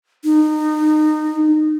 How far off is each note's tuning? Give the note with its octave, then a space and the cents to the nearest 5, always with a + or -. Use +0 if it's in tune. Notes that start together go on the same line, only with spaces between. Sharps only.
D#4 -25